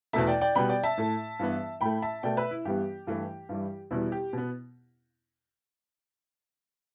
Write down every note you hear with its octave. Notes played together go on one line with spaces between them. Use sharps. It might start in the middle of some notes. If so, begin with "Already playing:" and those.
E2 B2 A3 E5 A5
D5 G5
D5 G5
B2 G3 B3 G5 B5
D5 G5
E5 A5
A2 A3
G2 E3 B3
A2 A3 G5 B5
E5 A5
B2 A3 D5 G5
B4 E5
E4
G2 E3 G3 B3 G4
G2 E3 A3
G2 E3 G3
E2 B2 G3 B3 E4
G4
B2 B3